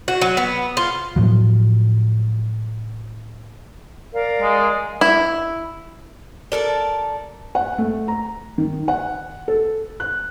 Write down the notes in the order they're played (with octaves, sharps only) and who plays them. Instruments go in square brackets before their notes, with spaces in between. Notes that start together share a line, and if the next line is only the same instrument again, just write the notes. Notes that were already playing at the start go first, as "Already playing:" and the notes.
[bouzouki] F#4
F#3
B3
F4
[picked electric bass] A2 F3 F#3
[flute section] A#4 D5 F5
[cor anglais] G#3
[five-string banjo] E4
[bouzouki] A4 A#4 D5
[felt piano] F#5
A3
A#5
D#3
F#5
A4
F#6